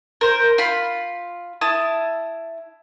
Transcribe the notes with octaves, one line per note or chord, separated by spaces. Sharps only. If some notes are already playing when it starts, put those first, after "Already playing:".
A#4 C5
F4 B5
E4 A5 D#6